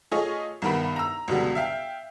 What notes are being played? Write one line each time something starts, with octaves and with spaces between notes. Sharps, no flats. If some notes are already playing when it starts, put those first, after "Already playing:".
A3 F4 G#4 C#5 D#5
C2 G2 D#3 B3 A#4 B5
A#5 E6
C#2 B2 D3 F#3 G3 B3
E5 F5 G5